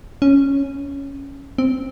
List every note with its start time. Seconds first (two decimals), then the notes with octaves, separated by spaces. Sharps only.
0.22 C#4
1.58 C4